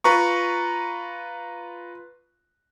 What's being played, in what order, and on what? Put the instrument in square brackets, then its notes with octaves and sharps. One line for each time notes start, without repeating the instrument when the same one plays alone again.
[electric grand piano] F4 B4 A#5 C#6